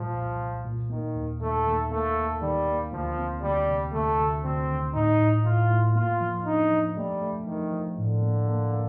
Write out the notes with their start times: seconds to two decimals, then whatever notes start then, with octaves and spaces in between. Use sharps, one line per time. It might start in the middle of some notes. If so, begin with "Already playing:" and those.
Already playing: A#2 F3 G3
0.14 C2
0.39 C2
0.65 A#2
0.90 D#3 A#3
1.15 D#2
1.41 D#2 A3
1.66 D#2
1.91 A3 A#3
2.17 D#2
2.41 D#3 G3
2.67 A#3
2.92 D2 F3
3.17 C4
3.42 D2 G3
3.68 C3
3.93 D2 A3
4.18 D2
4.44 D2 C4
4.69 D#3
4.94 A2 D#4
5.20 A2
5.45 A2 F4
5.70 A2
5.95 A#3 F4
6.21 F3
6.45 D4 D#4
6.71 F3
6.96 G3 A3
7.22 A3
7.47 D#3 F3
7.72 F3
7.98 A2 D3
8.23 A#3
8.48 A#3
8.73 A#3